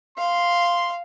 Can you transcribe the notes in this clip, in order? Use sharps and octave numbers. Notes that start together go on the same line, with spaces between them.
F5 C6